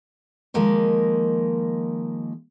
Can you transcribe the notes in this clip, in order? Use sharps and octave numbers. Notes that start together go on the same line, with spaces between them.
D#3 F3 G#3 A#3